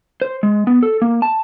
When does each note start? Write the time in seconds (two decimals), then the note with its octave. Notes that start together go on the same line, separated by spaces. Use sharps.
0.22 C5
0.43 G#3
0.67 B3
0.83 A4
1.02 A#3
1.22 A5